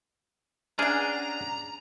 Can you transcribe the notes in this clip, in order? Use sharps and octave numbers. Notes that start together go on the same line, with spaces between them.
C#4 D4 G#4 F#5 G5 A#5